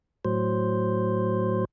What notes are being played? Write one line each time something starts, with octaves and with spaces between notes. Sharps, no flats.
A2 F#3 C5